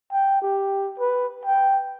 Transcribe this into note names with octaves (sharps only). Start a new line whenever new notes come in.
G5
G4
B4
G5